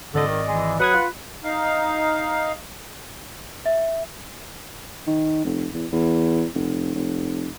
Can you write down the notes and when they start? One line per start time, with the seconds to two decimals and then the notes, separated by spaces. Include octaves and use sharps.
0.14 G#1 D3 D5 D#5
0.27 D#3
0.48 E3 G#3
0.80 F#3 B4 F#5 D#6 G#6
0.94 F4
1.44 D#4 F5
3.66 E5
5.07 D#3
5.45 F1
5.73 E2
5.92 E2
6.54 F1
6.95 F1